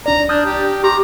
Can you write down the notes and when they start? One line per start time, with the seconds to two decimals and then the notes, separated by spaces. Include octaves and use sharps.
0.06 C2 D4 D5 A#5
0.29 D4 D#6 F6 G6
0.46 G4
0.84 G4 A#5 C6 D6